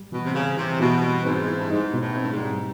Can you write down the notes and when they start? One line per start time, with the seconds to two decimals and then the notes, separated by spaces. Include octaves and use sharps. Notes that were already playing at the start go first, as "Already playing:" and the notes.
Already playing: G3
0.12 B2 E3
0.25 C3
0.34 C#3 C4
0.57 C3 E3
0.80 B2 E3
1.02 G3
1.25 G#2 C4
1.48 E4
1.58 G2
1.70 G#2 D#4
1.94 B2
2.01 A2
2.17 G2 C4
2.31 G#2
2.38 G3